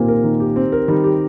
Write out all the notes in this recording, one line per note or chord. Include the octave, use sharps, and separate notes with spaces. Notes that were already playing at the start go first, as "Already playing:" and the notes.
Already playing: A#2 D#3 A#3 C4 G4
A#4
D#3
G4
C4
A#4
D#3 G3
G4